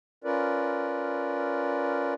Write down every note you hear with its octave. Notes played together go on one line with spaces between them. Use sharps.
C#4 F4 A#4 B4 D5